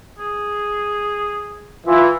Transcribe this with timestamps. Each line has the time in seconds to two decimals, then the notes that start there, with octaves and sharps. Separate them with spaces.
0.19 G#4
1.87 E3 F4 E5